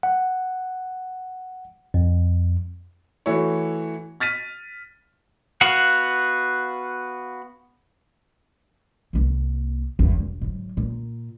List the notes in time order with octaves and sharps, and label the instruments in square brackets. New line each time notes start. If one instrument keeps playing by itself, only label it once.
[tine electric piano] F#5
F2
[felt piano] E3 A3 E4 F#4 C#5
F6 A6 B6 D#7
[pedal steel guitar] B3 F#4 F5 F#5
[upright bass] C2 A#3
G#1 E2
E1
G#2 F#3
A#2